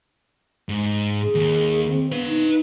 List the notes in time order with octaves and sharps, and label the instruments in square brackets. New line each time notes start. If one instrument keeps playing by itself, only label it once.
[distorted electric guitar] G#2
[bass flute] G#4
[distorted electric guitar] D#2
[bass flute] C4
[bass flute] B3 [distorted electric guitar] B4 F5
[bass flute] D#4